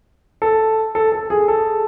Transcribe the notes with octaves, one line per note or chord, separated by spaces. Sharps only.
A4
A4
A4
G#4
A4